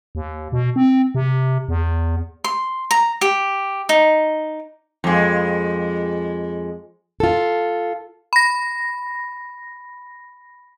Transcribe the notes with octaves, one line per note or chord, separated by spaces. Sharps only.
D#2
B2
C4
C3
E2
C6
A#5
G4
D#4
F2 G#3
F4 A4
B5 A#6